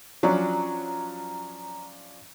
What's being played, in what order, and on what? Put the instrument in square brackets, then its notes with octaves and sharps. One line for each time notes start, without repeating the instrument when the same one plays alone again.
[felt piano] F3 C#4 D4 [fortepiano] F#3 [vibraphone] A#5